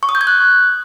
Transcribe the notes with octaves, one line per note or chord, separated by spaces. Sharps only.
C#6
D#6
G6
G#6
F#6